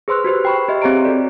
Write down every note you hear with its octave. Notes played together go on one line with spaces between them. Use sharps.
G#4 B4 C5 C6 E6 F#6
F#4 G4 B4 C5
G5 B5 C#6
G4 C5 D#5 E5
C4 G4 G#4 C#5 A#5 D7
F#4 A4 D5